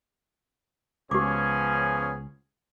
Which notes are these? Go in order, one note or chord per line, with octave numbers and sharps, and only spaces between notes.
C#2 F3 B3 C#4 G4 G#4 D6